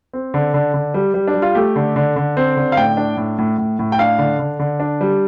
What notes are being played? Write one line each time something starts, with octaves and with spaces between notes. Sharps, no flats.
C4
D3
D3
D3
G3
G3
D4
G3
F4
A3 G4
D3
D3
D3
C4
D3
F5
A2 G5
D4
A2
A2
A2
A2
G5
D4 F5
D3
D3
D3
D4
G3